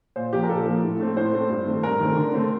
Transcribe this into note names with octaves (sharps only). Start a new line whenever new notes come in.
A#2 C5
F3 A#3 G4
A#4
A#2 A4
F3 A#3
A2
A3 C4
A2 C5
A3 C4
G2
D#3 A3 C4
G2 A#4
D#3 A3 C4
D3
A3 C4